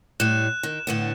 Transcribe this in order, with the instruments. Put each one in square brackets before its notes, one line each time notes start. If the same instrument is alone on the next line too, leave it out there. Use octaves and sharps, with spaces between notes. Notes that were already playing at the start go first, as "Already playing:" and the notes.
[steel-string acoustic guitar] A2 G3 [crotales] F#6 E7
[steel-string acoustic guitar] D#3
A2 D3 B3